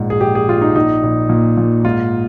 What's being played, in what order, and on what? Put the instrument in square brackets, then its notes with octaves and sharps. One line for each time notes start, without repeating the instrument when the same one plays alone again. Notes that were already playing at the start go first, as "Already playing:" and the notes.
Already playing: [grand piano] A#1 G#2
G#4
A#1 G4
G#4
A#1 F4
D#4
A#1 D#4
A#1
A#2
A#2
G#2 F4